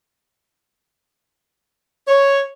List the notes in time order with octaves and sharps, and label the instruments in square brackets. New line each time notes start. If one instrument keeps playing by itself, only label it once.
[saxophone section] C#5